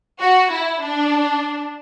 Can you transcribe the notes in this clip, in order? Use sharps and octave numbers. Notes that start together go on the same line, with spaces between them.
F#4
E4
D4